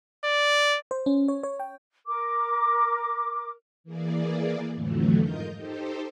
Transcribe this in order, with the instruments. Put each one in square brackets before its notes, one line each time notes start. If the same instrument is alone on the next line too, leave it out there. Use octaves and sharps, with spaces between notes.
[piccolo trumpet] D5
[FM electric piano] C5
C#4
C#5
C#5
G5
[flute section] A#4 D6
[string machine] E3 A#3 G#4 D5
F2 A2 D3 E3 F#3 A3
G#2 F4 A#4 D#5 G6
D#4 G4 A4 C5